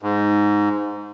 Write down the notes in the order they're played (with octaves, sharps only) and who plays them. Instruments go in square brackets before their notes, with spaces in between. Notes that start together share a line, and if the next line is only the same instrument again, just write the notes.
[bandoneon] G#2